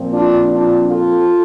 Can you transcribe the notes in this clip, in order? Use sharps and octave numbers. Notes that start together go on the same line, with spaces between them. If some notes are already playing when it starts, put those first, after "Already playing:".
Already playing: A#2 F3 C4
D4 F4
D4 F4
F4 A4